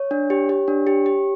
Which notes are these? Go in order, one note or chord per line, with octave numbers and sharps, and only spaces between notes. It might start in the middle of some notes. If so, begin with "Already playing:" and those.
Already playing: C#5
D4
G4
G4
D4
G4
G4